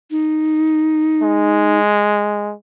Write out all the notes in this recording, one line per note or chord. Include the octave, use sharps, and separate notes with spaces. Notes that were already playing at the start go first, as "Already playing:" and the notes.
D#4
G#3